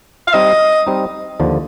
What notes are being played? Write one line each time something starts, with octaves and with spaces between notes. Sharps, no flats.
F5
G3 C4 D#4 D#5
G3 C4 D#4
D#2 D3 F3